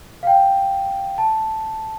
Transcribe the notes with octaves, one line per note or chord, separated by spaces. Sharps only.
F5
G5
A5